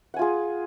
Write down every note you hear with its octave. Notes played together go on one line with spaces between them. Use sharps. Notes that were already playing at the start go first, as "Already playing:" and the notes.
F4 G#4 F#5 G#5